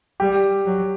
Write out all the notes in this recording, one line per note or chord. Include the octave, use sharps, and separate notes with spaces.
G3 G4
F#3